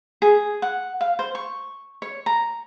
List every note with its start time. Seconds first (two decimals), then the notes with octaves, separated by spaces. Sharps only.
0.22 G#4
0.62 F#5
1.01 F5
1.19 C5
1.35 C#6
2.02 C#5
2.26 A#5